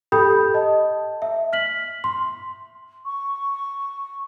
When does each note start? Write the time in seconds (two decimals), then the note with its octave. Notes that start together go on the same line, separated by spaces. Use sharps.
0.12 G4 A4 G5 B5 D#6 G6
0.54 D#5 A5
1.22 E5
1.53 F6 B6 F#7
2.04 C6
3.05 C#6